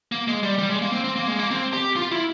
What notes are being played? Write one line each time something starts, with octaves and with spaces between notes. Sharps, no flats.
A#3
G#3
G3
G3
G#3
A#3
C4
C4
A#3
G#3
A#3
C4
G4
F4
E4